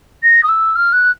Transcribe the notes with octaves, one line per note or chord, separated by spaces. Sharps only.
A#6
D#6
E6
F6
F#6